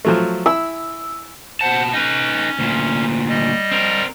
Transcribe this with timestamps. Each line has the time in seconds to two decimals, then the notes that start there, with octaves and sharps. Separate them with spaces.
0.05 F3 F#3 A3
0.46 E4 E6
1.61 B2 C5 F#5 A5
1.93 C#4 D#4 B4
2.59 D2 A#2
3.29 G3 D#5
3.71 C4 A#4